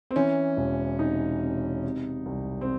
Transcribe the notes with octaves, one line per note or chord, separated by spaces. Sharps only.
C4
E3 C#4
E1
C3 D#4
C3
C3
C2
C4